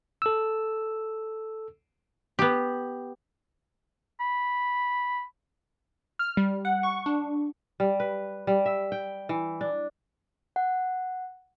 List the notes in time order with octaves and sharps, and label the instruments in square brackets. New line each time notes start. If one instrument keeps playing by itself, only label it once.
[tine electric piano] A4 E6
[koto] B3 G4
[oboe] B5
[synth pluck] F6
G3
F#5
C#6
D4
[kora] G3
B4
G3
E5
G5
E3
D4
[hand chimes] F#5